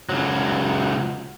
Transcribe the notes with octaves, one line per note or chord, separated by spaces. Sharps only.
C#2 F#3